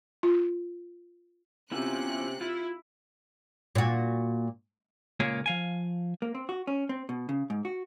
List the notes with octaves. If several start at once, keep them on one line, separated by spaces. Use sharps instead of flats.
F4
C3 B3 C#4 E4 F4 F#6
E4 F4
A#2 F#4
C#2 A#2 A#3 G#4 C#5
F3 F5 G#5
A#3
C4
F#4
C#4
C4
B2
C#3
G#2
F#4